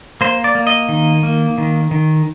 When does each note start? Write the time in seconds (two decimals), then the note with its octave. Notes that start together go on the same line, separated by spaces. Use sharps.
0.21 A#3 C5
0.44 D5
0.55 A#3
0.67 D#5
0.89 D#3
1.23 A#3
1.58 D#3
1.91 D#3